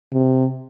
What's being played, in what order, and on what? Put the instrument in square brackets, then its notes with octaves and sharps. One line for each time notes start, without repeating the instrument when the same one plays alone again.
[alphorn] C3